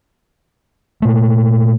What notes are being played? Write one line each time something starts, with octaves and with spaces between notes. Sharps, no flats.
A#2 A3